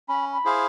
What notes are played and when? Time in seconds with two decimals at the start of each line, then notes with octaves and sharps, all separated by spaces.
0.08 C#4 B5
0.33 B5
0.45 E4 G#4 C5 F5